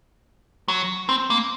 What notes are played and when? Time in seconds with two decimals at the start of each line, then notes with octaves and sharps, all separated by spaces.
0.68 F#3
1.09 C4
1.30 A#3